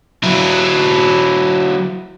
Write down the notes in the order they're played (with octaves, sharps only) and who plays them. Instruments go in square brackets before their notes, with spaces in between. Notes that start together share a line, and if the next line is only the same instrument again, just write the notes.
[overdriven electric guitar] F#3 E4